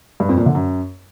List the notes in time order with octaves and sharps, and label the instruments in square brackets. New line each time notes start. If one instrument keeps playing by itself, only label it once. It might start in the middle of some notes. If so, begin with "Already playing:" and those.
[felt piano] G2
F2
A#2
D3
F#2